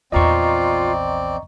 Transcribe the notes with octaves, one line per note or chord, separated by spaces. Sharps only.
A#1 E2 C4 F4 D5 D#5 A#5 C#6